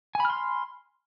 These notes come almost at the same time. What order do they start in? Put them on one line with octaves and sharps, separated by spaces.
G#5 B5 F6 C6